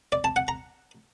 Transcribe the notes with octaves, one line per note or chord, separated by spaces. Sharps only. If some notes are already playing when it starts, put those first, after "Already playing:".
D5
A5
F#5
A#5